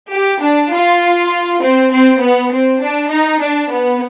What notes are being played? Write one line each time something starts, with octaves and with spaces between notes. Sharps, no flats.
G4
D4
F4
C4
C4
B3
C4
D4
D#4
D4
B3